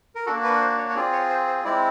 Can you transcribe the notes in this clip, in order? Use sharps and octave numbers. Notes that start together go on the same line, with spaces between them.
A#4
A#3 D4 F#4 A4
B4
C5
C#5
C#5
C4 F4 G#4 D5
C#5
C5
C5
G#3 C4 E4 D5